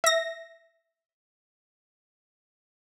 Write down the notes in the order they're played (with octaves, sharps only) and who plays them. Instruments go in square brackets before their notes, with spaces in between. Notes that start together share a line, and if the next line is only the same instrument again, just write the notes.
[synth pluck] E5 A#6